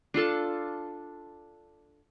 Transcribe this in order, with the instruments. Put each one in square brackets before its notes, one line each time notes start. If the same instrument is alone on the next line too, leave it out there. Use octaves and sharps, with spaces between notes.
[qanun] D4 F4 A4 A5